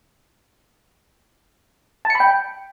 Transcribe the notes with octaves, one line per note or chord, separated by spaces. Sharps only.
A5
C#7
B5
G5